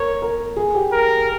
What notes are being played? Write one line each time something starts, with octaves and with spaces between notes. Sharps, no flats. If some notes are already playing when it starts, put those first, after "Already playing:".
Already playing: A#4 C#5
A#4
G#4
G4
A#4